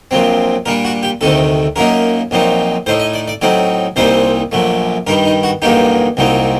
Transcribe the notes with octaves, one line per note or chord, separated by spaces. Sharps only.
A#1 A#2 F#3 C4
A#2 G3 D4 A#4
F#4
G4
D2 C3 D#3 A3 A4
F#2 F#3 A#3 D#4 A#4
A#1 A#2 F#3 C4 D#4
A2 A3 D#4 C5
D#5
D5
D5
A2 F#3 C4 D#4 D5
C2 A#2 G3 C4 D#4 C5
A#1 A#2 F#3 A3
G2 D#3 G3 A#4
D#4
F#4
A1 G2 F#3 A#3 D#4 G4
C2 A#2 F#3 C4 D#4